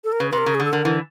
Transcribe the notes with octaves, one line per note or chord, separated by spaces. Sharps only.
A4
A#4
C#3 B4
C3 B4
A#4
C#3
G#4
D3
A4
D3 A#4
D3 E3